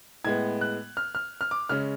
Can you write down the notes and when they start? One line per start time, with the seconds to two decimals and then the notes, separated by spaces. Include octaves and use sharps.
0.24 A2 G#3 B3 G#6
0.61 F#6
0.97 F6
1.15 F6
1.41 F6
1.51 D6
1.69 C#3 G#3 C#4 F6